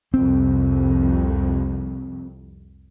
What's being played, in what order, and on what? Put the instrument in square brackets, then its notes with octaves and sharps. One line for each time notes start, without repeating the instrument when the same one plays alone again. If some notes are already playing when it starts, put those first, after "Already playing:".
[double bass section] C2 F2 [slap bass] C4